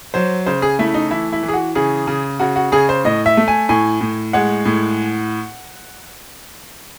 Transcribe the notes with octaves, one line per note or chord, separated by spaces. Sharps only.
F#3 C5
C#3 C5
G#4
A3 E4
D#4
E3 E4
E4
E3
G#4
F#4
C#3 G#4
C#3
C#3 F#4
F#4
C#3 G#4
C5
A2 D#5
E5
A3
G#5
A2 G#5
A2
G#3 F#5
A2